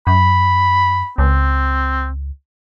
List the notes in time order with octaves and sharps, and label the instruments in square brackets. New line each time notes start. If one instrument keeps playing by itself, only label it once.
[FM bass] F#2 [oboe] B5
[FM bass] C#2 [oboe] C4